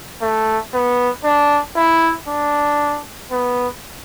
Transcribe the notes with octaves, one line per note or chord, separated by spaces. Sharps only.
A3
B3
D4
E4
D4
B3